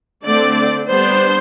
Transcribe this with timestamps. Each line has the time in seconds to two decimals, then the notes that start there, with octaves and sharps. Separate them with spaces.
0.24 D3 A3 C4 D5
0.88 G3 B3 D4 C5